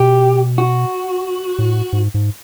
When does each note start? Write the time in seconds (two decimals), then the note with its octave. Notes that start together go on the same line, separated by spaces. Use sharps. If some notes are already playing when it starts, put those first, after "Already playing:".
Already playing: B2 G4
0.58 F#4
1.59 A2
1.93 G#2
2.14 G#2